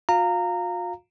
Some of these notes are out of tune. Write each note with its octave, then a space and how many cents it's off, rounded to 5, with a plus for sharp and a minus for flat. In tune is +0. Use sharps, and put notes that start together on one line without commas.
F4 +45 F5 +0 A#5 -20